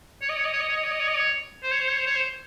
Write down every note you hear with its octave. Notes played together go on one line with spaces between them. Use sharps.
C#5
D#5
C#5
D#5
C#5
D#5
C#5
D#5
C#5
D#5
C#5
D#5
C#5
C5
C#5
C5
C#5
C5
C#5
C5